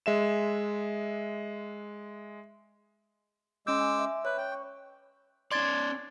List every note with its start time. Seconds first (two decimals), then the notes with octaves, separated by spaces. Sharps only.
0.06 G#3 E5 E7
3.67 G#3 C#4 D6 E6 G6
3.80 G#5
3.99 E5
4.25 B4 C#5
4.38 G5
4.52 C#6
5.51 C#4 D5 C6 G#6 A6